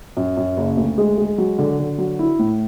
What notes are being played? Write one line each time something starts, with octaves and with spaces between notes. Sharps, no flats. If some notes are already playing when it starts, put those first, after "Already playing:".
F#2
F#2
F#1
D2
G#3
G#3
F#3
D3
D3
F#3
E4
A2